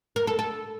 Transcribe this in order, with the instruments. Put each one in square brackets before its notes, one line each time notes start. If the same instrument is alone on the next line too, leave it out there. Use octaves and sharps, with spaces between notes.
[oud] A#4
A4
A4